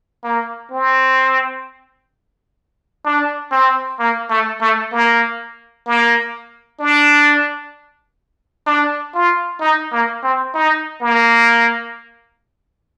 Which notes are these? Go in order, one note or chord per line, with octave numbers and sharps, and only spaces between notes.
A#3
C4
D4
C4
A#3
A3
A3
A#3
A#3
D4
D4
F4
D#4
A#3
C4
D#4
A#3